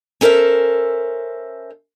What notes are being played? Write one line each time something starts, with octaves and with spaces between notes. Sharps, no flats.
C#4 A4 A#4 C5 E5